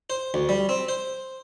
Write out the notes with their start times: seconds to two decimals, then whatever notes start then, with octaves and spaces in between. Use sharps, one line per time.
0.10 C5
0.34 D2
0.49 G3
0.69 C4
0.89 C5